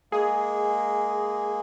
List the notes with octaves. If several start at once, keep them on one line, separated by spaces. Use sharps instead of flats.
G#3 A#3 G#4